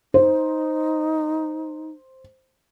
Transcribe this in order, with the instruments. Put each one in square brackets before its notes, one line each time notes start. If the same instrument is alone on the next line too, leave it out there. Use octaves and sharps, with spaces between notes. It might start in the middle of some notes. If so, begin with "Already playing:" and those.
[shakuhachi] D#4 [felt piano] C5